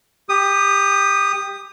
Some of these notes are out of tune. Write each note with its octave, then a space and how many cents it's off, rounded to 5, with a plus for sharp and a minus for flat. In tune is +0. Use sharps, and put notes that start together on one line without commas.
G4 +15 D#6 -15